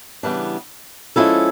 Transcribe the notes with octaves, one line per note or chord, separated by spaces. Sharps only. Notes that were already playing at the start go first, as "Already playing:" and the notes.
C#3 E3 G3 B3 D4
F3 G#3 C#4 E4 A4